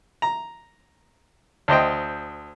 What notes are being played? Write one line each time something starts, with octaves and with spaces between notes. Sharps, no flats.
A#5
D2 C5 D#5 G5